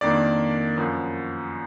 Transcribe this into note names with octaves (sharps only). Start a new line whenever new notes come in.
F2 D#3 A#3 D4 D5
F#2 F3 B3